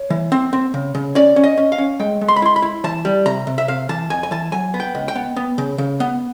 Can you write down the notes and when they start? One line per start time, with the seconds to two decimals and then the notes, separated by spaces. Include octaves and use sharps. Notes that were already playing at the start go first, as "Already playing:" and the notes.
Already playing: C#5
0.10 E3
0.32 C4
0.53 C4
0.74 C#3
0.95 C#3
1.15 C#4 D5
1.36 C#4
1.44 D#5
1.58 C#4
1.72 F5
1.78 C#4
2.00 G#3 G5
2.21 G#3
2.28 C6
2.36 B5
2.42 E4 C6
2.56 B5
2.62 E4
2.84 E3 A5
3.05 G3
3.26 C3 A#5
3.47 C3
3.58 E5
3.68 C3 F5
3.89 E3 A5
4.10 F2 G#5
4.23 G#5
4.31 E3 A5
4.52 F#3 G#5
4.74 B3
4.80 G5
4.95 C#2
5.08 G5
5.15 B3
5.36 B3
5.58 C#3
5.78 C#3
6.00 B3